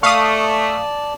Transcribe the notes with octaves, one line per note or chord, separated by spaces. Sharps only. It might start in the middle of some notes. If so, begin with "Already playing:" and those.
A3 D5 F5 A5 C#6 D#6